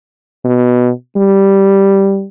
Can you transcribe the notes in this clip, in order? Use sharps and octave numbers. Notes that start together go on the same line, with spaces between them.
B2
G3